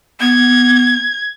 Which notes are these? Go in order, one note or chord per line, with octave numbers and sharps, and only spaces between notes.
B3 G#6